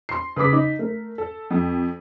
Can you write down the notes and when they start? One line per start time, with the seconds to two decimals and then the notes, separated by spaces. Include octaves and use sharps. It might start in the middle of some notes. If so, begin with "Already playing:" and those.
0.09 C6 C7
0.36 C#3 B4 B5 D6 B6
0.53 D#4
0.79 A3 A#4
1.18 A4
1.50 F2